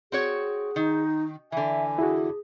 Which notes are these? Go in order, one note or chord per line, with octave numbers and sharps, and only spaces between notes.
C4 F#4 G#4 C#5
D#3 D#4
D3 E3 E5 G#5
E4 F#4 G#4